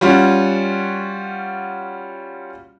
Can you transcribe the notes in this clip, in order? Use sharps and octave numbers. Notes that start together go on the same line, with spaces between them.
G3 C#4 F4 F#4